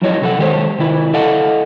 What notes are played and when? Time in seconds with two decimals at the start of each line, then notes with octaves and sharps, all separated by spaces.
0.02 F#2 F3 F#3 E4 C#5 D#5
0.21 C3 A4 F#5
0.39 D#3 G#3 G4 C5 C#5
0.79 C3 D#3 E4 B4
1.13 E4 A4 D#5 F5 F#5